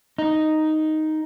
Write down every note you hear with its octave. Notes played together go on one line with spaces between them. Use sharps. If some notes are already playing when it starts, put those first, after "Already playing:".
D#4